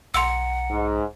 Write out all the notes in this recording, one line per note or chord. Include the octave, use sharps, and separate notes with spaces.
B1 F#5 A#5 C6 E6
G#2